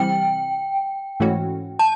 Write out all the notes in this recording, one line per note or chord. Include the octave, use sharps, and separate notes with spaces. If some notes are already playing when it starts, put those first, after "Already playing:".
Already playing: C3 E3 G3 C4 G5
G#2 E3 A3 C#4 F#4
A5